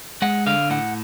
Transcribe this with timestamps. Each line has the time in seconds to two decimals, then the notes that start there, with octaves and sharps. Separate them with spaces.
0.22 G#3 F#5
0.46 D3 F5
0.70 A2 F#5